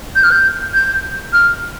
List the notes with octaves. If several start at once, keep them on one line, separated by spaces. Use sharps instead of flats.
G6
F6
G6
G6
F6